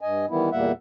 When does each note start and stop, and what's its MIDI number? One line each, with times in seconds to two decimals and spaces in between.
0.01 0.26 43
0.01 0.26 75
0.01 0.26 80
0.30 0.50 51
0.30 0.50 52
0.30 0.50 55
0.30 0.50 59
0.30 0.50 64
0.52 0.72 40
0.52 0.72 46
0.52 0.72 55
0.52 0.72 58
0.52 0.72 76
0.52 0.72 78